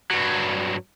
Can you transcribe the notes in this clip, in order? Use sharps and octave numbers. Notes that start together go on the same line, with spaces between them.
G2 F#3